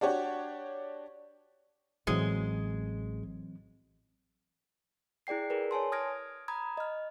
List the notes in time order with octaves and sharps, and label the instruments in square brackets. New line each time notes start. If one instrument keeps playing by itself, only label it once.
[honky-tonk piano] D4 F#4 G4 C#5
[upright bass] A1 [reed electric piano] E3 F#3 C4 [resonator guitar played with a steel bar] G#3
[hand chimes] E4 G#4 D5 G5 C7
G#4 A#4 B4
C#5 G#5 A5 C6
D#6 F6 G#6 A#6 D7
A#5 B5 D#6 G#6
D#5 F6